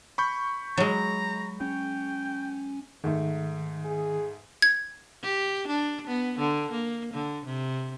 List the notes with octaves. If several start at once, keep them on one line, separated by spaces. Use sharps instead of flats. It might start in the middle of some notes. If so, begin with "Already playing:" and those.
B5 C#6 G6
F#3 G#3 A#5
C#4 G5
G#2 D#3 A3
G#4
G#6
G4
D4
B3
D3
A#3
D3
C3